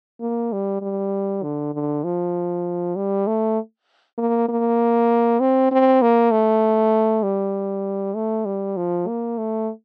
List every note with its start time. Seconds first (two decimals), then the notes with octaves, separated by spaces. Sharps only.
0.21 A#3
0.52 G3
0.82 G3
1.43 D3
1.74 D3
2.04 F3
2.96 G3
3.27 A3
4.18 A#3
4.48 A#3
5.40 C4
5.72 C4
6.02 A#3
6.31 A3
7.23 G3
8.16 A3
8.45 G3
8.77 F3
9.07 A#3
9.38 A3